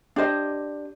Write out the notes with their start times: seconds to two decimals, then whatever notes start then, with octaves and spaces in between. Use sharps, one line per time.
0.16 D4 G4 C5 D#5